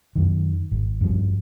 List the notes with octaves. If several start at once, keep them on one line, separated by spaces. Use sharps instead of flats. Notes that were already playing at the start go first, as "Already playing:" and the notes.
F#2 D#3
G#1
G2 F3